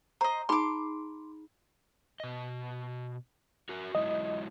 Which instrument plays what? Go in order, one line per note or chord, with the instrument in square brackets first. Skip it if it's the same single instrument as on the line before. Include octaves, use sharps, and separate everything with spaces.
[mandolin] C5 D#5 [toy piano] A#5
[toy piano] D#4 G#4 B5 [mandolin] C6 D6
[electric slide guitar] B2 D#5
F#4 A#4 E5
[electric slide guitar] F#3 G#3 E4 [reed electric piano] D#5